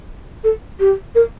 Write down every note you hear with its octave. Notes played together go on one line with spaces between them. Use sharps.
A4
G4
A#4